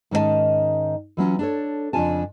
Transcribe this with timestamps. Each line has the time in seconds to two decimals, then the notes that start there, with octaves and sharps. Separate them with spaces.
0.11 G#2 D#3 C#4 A4 D#5 A5
1.17 E3 F#3 C#4 F4
1.39 D4 A4 C#5
1.93 F2 C#3 D4 F4 G#5 A5